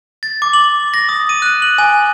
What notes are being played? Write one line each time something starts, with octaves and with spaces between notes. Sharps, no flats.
A6
D6
F#7
A#6
D#6
D#7
F#6
F#7
G#5